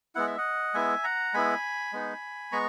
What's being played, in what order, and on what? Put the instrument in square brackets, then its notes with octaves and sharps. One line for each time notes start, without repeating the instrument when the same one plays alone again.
[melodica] G#3 B3 E4 F#5
E5
D#5 F#5
G#3 B3 E4 E5 G#5
F#5 A#5
G#3 B3 E4 G#5 B5
G#3 B3 D#4
G#3 B3 A#5 C#6